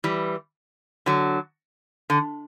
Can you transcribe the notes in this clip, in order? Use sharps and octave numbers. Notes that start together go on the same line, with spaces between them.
E3 G3
D3 F#3
D3